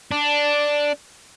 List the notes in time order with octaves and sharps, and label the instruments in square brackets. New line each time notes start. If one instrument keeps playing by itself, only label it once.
[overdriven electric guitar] D4